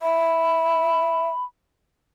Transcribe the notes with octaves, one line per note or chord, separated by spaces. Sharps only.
E5 B5